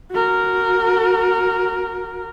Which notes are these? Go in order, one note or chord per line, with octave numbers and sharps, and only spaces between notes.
F#4 A#4